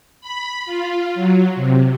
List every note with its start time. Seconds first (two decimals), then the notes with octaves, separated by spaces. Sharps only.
0.21 B5
0.65 F4
1.15 F#3
1.55 C3